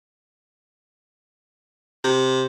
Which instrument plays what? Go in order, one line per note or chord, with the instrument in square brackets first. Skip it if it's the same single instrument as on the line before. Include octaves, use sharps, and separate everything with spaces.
[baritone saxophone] C3